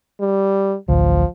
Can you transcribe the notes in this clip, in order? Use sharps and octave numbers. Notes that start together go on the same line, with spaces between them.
G3
A1 D2 F3